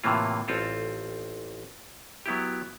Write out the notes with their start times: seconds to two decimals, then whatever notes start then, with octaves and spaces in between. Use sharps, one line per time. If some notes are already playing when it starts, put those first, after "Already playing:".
0.04 A2 C3 E3 A#3 F4
0.48 A1 C4 F4 A4
2.26 F#3 B3 E4 G4